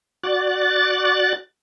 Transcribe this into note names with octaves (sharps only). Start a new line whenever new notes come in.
F#4 D5 F#6 A6